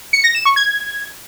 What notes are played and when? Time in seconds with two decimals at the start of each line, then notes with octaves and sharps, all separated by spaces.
0.13 C#7
0.24 A#6
0.35 E7
0.45 C#6
0.56 G#6